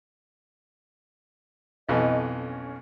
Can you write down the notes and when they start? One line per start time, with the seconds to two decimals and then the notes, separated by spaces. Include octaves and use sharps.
1.89 B1 F2 E3 D#5
2.36 C#4